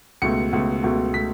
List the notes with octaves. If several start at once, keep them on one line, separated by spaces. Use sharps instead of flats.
C#2 B2 A3 C#7
C#2 B2 A3
C#2 B2 A3
B2 A3 B6